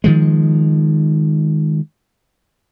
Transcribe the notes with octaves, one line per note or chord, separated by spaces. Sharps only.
D#3 F3 G#3